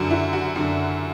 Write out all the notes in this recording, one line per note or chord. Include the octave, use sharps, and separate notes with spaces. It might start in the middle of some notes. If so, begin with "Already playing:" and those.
Already playing: F#2 D3 F#4
E4
F#4
F#2 D3